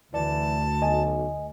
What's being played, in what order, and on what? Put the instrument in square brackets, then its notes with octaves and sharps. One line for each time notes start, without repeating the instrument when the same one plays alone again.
[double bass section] D2 [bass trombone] E3 [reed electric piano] D5 [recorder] A5
[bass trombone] B1 [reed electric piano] D#5 G#5